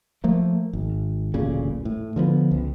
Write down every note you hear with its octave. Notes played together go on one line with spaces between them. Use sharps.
F3 A3 A#3
G#1
D1 A1 A#2 C#3
A2
D3 F3 A#3 B3
C#2